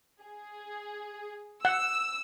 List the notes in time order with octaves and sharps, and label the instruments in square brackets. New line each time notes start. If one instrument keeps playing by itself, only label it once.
[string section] G#4
[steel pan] F#5 [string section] E6